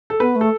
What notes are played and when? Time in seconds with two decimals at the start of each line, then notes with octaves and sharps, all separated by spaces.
0.10 A4
0.20 B3 B4
0.36 A3
0.41 A4